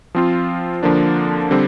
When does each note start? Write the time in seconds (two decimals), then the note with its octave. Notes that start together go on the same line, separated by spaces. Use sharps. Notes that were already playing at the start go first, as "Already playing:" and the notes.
0.15 F3 C4 F4
0.83 D3 F3 A#3 D4
1.51 D3 G3 C4